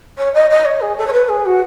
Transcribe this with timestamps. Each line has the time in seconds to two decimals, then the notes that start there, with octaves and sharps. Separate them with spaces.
0.18 C#5
0.34 D#5
0.50 D#5
0.65 C#5
0.81 G#4
0.97 A4
1.07 C#5
1.12 B4
1.28 G#4
1.45 F#4